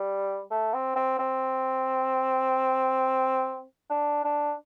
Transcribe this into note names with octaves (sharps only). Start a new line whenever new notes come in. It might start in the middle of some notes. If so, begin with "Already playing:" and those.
Already playing: G3
A3
C4
C4
C4
D4
D4